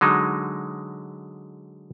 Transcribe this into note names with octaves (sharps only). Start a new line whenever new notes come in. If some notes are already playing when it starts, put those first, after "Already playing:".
D3 F#3 G#3 D#4